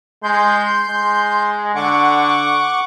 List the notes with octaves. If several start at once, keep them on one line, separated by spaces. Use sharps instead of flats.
G#3 C6 G6
G#3
D3 F#5 C#6 D6